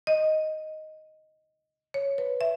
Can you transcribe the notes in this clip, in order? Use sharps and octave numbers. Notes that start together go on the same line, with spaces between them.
D#5
C#5
B4
E5